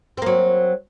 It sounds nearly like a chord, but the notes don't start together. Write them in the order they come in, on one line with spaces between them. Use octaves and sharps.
C4 A#3 F#3